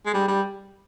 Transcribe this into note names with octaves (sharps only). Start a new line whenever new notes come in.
G#3
G3
G3